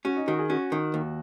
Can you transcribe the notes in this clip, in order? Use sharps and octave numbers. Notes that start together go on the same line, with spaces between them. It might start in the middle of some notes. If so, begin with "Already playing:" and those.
C#4 F#4
D#4
D#3 F#4
G#4
C#4 F#4
D#3
D#2